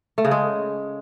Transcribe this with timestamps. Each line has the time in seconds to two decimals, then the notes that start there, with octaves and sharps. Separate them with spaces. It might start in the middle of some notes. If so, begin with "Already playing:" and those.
0.18 A3
0.25 C#3
0.31 G#3